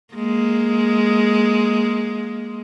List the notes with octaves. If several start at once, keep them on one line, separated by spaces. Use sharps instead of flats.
G#3 A#3